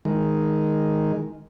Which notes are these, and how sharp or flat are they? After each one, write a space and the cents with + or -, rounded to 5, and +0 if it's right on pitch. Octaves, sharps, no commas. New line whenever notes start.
D#3 +0 G#3 +0